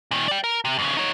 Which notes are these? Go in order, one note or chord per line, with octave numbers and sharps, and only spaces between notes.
A#2 D#3
D5 G5
A#4
C3
F2 C#3
D#4 C#5